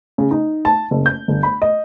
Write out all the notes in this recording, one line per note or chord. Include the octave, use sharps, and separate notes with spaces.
C#3
D#4
A5
F#1
G6
G1
B5
D#5